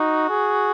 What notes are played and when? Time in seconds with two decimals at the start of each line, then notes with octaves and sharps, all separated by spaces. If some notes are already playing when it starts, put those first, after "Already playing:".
Already playing: D#4 F#4
0.30 G#4